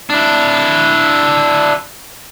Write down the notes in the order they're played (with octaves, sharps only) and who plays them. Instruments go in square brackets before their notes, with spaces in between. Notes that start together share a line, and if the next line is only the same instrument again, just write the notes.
[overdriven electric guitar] D4 E4